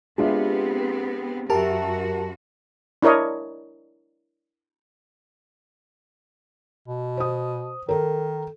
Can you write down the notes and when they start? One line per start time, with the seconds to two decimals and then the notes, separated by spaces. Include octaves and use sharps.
0.18 C3 G#3 B3 C4 D4 F4
1.50 F#2 F#4 G4 A#4 E5 A5 B5 C6
3.02 D4 E4 A#4 C#5 D#5
6.88 B2
7.17 C5 D#6
7.89 D#3 A4 A#4